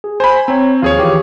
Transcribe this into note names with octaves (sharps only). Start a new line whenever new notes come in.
G#4
C5 G#5 B5
C4 C#5 A#5
D#2 F3 F4 G#4 C#5 F5
D#3 E3 G4